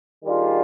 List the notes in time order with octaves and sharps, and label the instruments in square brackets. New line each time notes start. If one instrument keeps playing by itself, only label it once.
[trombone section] D#3 G3 D4 F4 G#4